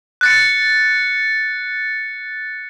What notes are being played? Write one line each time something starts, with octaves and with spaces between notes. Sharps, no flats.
F#6 A6 C#7